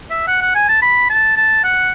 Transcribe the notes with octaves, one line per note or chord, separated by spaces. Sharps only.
E5
F#5
F#5
G#5
A5
B5
A5
A5
F#5